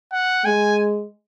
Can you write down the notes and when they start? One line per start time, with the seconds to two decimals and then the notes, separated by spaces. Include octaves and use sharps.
0.12 F#5
0.45 G#3 G#5